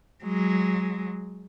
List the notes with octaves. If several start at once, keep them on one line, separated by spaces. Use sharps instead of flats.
F#3 G#3